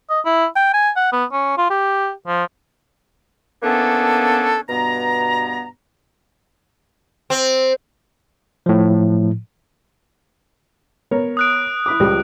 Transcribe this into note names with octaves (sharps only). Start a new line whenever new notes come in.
D#5
E4
G5
G#5
F#5
B3
C#4
F4
G4
F3
E3 A#3 B3 C#4 D4 A4
G2 B2 B3 A#5
C4
A2 F3
B3 A#4 C#5
D#6 F#6 D7
E4 B5 D6
C#2 F3 G3